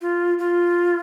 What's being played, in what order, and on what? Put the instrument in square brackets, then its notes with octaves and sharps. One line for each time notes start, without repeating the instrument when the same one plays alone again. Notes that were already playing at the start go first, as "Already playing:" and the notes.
[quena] F4
F4